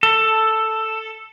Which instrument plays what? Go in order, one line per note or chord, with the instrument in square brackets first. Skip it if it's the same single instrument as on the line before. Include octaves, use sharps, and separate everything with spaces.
[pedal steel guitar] A4